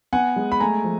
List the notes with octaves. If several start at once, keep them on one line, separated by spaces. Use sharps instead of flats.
B3 F#5 G#5
G#3
B5
A3 G#5 A#5
F3